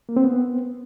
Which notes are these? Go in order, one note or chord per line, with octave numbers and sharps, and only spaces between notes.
A#3
C4
B3